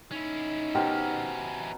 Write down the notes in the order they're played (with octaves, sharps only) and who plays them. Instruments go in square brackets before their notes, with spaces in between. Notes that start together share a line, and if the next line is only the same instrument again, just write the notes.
[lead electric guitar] C#4 E4 [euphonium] D#4
[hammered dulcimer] B2 A#4 C5 [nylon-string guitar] G4